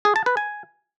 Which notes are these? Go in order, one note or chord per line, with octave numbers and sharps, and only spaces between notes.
G#4
A5
B4
G#5